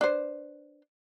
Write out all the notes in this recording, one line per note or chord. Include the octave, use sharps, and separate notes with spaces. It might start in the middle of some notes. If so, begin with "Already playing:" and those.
D4 B4 C5